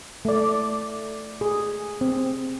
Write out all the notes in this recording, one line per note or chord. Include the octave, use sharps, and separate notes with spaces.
A3 D5
G#4
C4